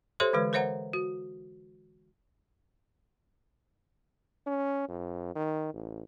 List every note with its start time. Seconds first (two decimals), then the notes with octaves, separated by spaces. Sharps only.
0.20 G4 A4 C5 C#5 E5 C6
0.33 D3 E3 G#3 B4
0.53 A#4 C5 C#5 E5 F#5 A#5
0.93 F#4
4.47 C#4
4.89 F2
5.35 D#3
5.73 A1